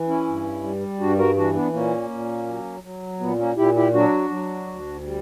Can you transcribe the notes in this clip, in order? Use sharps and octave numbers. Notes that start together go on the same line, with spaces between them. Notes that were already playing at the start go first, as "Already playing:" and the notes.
Already playing: E3
C#4 E4
G2
G3
G2 D4 F#4
F#4 A#4
E3 D4 F#4
B3 D4
A#2 A#3 C#4
A#2
F#3
F#3
A#2 B3
A#3 C#4
A#2 E4 G4
E4 G4
F#3 D4 F#4
F#3
D2
G3